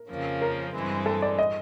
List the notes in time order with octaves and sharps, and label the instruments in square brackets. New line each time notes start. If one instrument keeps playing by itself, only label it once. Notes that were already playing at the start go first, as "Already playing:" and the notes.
Already playing: [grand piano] A#4
[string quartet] F2 C#3 F3 A#3 C#4
[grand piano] A#4
[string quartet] G2 E3 G#3 C4
[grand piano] A4
D5
D#5